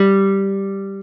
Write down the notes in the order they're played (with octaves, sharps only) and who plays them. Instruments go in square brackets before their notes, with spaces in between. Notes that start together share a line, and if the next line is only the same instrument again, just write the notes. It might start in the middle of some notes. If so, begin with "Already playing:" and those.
Already playing: [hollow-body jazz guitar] G3